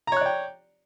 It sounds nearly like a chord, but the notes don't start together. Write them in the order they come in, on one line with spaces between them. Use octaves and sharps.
A#5 C#5 F#6 D5 G5